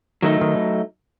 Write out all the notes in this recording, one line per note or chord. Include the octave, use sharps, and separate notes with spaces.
D#3 F#3 A3 D#4
D#3